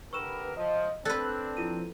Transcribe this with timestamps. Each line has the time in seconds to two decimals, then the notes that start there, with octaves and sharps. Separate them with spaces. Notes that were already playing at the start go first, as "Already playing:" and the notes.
0.13 D3 G4 A#4 B4 C#6 E6 E7
0.57 F3 D#5
1.05 C4 D4 A4 B4 D5 F#6
1.57 F3 E4 F4 D#7